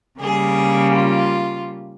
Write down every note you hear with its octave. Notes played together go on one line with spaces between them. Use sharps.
C#3 G3 A#3 G#4
F4